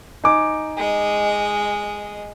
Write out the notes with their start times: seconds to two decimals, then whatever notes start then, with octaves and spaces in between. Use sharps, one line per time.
0.24 D#4 G#5 D6
0.77 G#3 D#5